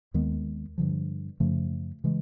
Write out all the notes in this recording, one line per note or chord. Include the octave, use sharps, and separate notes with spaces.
D#2 D#3 G#3 B3
G2 D3 F3
F#2 C#3 F3 A3
C#3 E3 G#3